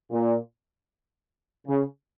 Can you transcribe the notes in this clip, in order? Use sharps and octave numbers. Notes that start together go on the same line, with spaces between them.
A#2
C#3